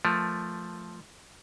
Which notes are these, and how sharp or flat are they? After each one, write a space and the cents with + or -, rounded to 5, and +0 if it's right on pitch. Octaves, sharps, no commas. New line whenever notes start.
F3 +0 A3 +0 A#4 +15